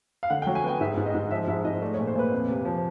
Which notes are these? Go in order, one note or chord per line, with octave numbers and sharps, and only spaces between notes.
F5
D3 F#5
G5
F#3
G#5
B3 G5
G#2 E5
G#2
D#5
G#2
F3 E5
G#2 E5
G#2 D#5
A3 D5
C#5
A#2
C5
A#2 B4
F2
C3
F3